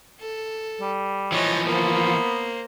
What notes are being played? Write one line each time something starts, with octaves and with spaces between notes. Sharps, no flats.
A4
G3
E3 F3 C#5 D#5
A#3 B3 C5